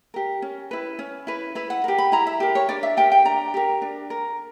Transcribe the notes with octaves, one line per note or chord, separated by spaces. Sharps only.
G4 A#4
C#4
E4 B4
C#4
E4 B4
E4 B4
F#5
G4 A#4
B5
E4 A#5
E5
G4 A#4
C#5
D4 D5
E5
G4 A#4 G5
G5
D4 A#5
G4 A#4
D4
A#4